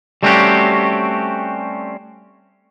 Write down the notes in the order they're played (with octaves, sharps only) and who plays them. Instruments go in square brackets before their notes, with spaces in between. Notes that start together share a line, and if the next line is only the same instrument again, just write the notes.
[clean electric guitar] G3 A3 C4 C#4 F#4 G4